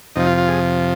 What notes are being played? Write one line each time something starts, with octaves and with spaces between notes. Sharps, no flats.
F2 C3 F3 D#4
F4
F4
G#4